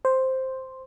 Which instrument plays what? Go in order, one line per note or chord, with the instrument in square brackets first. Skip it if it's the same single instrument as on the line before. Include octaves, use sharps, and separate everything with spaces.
[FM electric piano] C5